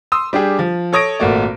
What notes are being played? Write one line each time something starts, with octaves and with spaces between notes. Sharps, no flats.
C6 D#6 E6
G3 D4 G4 G#4
F3
A4 C#5 D#6 A#6 D7
G#1 A#2 A3 F#4 D5